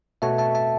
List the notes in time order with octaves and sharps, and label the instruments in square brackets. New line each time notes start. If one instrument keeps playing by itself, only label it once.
[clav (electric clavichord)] B2 A3 F#4 C#5 [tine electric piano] E5 A5
[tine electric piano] E5 A5
E5 A5